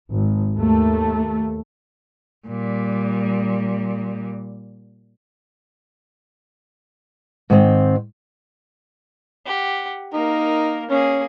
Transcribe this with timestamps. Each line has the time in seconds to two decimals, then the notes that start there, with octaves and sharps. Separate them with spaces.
0.11 G#1
0.55 D#2 A3
2.48 A#2 G3
7.50 G#2 D#3 C4
9.46 G4 F#5
10.13 A#3 D#4 A#4
10.90 A#3 C#4 G#4